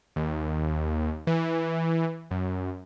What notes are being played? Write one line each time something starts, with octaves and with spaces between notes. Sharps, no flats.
D#2
E3
F#2